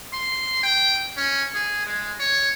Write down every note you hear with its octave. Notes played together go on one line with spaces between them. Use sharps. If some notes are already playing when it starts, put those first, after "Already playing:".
C6
G5
C#4
G#4
G#3
C#5